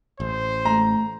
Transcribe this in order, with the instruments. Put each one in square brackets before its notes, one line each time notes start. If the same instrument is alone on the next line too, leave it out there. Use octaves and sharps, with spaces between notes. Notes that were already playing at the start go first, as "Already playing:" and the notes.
[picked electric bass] A1 [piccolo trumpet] C5
[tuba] A3 [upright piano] A#5